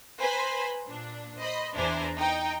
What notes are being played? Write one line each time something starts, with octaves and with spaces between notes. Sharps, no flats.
B4 C5 G#5 A#5 B5
A#2 D4
C5 D#5 B5 D#6
E2 D4 E4 C5 G#5 A#5
D#4 G5